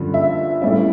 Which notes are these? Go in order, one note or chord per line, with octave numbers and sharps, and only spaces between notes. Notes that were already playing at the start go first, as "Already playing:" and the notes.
Already playing: G2 D3 F3 C#4
E5
A2 G3 C#4 E5